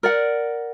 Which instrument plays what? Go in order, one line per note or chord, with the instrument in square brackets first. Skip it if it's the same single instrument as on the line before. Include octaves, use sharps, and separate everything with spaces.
[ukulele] A#4 D5 F#5